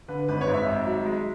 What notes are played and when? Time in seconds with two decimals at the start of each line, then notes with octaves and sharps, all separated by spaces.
0.08 D3 B4
0.28 G#1 B4
0.41 C#5
0.47 G#2
0.54 E5
0.67 G#1
0.86 F#3
1.06 G#3